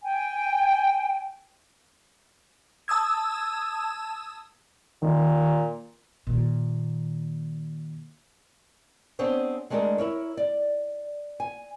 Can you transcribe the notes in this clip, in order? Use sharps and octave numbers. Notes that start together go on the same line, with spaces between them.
G5 G#5
A5 D#6 E6 G#6
A#2 D#3
A#2 D#3
B3 C4 D4 G#4 C5 C#5
G#3 A3 D4 F#4 G#4 A#4
E4 A#4 C#5
D5
G#5